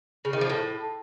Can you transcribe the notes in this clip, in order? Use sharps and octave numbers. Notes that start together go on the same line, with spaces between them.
C#3
D#3
F3
A2